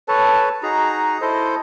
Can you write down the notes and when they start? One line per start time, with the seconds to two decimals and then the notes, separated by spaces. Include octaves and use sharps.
0.08 A4 B4 C#5 A5
0.63 D#4 F#4 G#4 A#5
1.21 E4 A4 C5 D#5